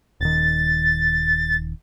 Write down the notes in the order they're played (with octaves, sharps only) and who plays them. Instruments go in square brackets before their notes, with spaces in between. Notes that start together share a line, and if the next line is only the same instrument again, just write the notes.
[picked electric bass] D#1 D#3 [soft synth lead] A6